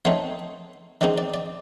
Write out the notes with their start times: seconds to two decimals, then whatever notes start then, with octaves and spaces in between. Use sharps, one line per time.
0.05 F3 A3 C4 D#4 C#5
1.01 D#3 G#3 C4 D#4 D5
1.18 D5
1.34 D5